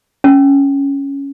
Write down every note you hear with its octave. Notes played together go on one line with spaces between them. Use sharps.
C#4